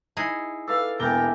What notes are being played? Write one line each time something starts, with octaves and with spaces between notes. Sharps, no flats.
D#4 E4 G#4
A4 B4 E5 F5 D6
E1 E3 A#3 G5 A#5 D6 G7